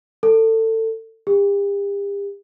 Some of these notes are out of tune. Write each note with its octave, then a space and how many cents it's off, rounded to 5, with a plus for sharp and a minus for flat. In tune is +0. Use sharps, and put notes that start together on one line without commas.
A4 +25
G4 +40